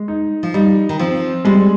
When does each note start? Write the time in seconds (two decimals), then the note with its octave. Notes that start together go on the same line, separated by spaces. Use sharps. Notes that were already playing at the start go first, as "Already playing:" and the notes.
Already playing: G#3
0.08 D#4
0.43 F3
0.54 G3 D#4
0.89 D#3
0.99 F3 C4
1.45 G3 G#3